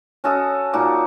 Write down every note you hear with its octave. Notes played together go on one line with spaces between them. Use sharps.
C#4 F#4 A4 D#5
A#2 D#4 F#4 D6